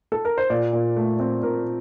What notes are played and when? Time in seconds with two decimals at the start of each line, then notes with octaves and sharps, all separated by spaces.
0.12 A4
0.25 A#4
0.38 C5
0.50 A#2 D5
0.73 A#2
0.97 A3
1.20 C4
1.43 A#2 A#4